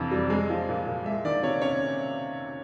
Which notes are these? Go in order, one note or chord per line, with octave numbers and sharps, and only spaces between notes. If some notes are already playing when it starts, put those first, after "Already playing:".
Already playing: F2 C3 E3
G3
G#3
F3
A#2
A#2
G#3 E5
D#3 D5
C3 C#5
C#4 C#5